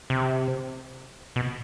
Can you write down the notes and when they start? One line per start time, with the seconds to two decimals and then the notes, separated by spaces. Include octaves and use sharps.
0.10 C3
1.36 B2